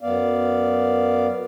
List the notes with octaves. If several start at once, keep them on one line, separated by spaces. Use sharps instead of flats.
F#2 B3 D5 F5